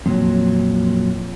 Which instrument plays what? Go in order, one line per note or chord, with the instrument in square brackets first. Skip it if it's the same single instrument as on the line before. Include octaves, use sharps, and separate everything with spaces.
[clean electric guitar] F2 A#2 E3 F#3